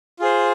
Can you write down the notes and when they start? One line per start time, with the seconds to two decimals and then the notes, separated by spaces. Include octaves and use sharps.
0.19 F4 G#4 C5